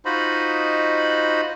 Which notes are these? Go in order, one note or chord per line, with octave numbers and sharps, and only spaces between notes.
D#4 F4 F#4 C5 D#5 B5